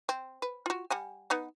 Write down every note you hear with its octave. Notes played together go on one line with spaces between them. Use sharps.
C4
B4
F4 F#4
G3 F#5 G#5
B3 D#4 F#5